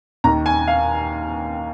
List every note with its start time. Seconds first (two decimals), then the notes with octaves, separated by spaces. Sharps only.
0.24 D#2 A#5
0.27 D#3
0.46 G#5
0.68 F5